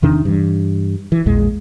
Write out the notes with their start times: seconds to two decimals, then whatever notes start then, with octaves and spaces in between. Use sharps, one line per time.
0.02 E2 C3 D#3 D4
0.25 G2 E3
1.12 E3
1.26 A#1 E2 A#2 G#3